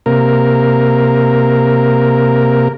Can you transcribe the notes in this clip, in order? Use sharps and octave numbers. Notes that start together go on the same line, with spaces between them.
C3 A#3 A#4